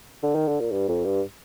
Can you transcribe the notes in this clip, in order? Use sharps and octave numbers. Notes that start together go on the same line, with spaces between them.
D3
D#3
D3
A#2
G2
F2
G2